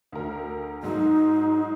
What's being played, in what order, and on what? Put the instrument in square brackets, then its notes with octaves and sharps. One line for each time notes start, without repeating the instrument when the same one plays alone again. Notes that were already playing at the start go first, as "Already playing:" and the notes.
[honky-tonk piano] D2 A#4
[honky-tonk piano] G#2 F#3 G#3 [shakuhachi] D#4